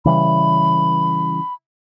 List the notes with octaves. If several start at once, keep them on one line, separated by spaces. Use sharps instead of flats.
C#3 E3 G3 B5